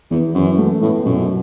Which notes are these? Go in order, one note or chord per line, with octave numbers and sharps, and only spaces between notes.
E2 E3
F#2 E3
A3
A2 B3
F#2 B2